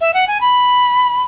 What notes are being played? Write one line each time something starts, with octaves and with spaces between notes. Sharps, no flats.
E5
F#5
G#5
B5